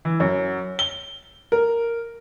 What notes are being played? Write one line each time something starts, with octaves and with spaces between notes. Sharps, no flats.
E3
F#2
G7
A#4